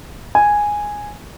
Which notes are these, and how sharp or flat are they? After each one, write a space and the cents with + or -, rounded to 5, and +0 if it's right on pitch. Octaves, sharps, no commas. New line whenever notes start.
G#5 -5